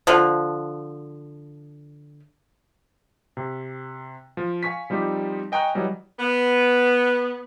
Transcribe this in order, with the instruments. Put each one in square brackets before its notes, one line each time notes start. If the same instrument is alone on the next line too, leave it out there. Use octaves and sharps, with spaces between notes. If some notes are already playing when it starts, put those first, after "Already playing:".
[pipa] D3 F3
[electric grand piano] C3
F3
F5 G#5 C#6 B6
F3 G3 C4 D#4 G4
D#5 G5 G#5 A#5 C#6 F#6
E3 F#3 G3 D#5
[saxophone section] B3